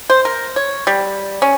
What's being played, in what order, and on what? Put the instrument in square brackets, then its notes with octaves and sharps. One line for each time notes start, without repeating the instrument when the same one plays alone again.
[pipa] C5
A#4
C#5
G3
C#4